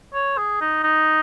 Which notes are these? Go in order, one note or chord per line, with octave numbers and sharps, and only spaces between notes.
C#5
G#4
D#4
D#4